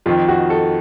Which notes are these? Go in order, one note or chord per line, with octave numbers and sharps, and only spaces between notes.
F2 D#3 F4
F#4
A4